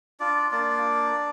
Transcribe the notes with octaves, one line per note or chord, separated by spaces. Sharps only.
D4 F4 D5
A#3 D4 D5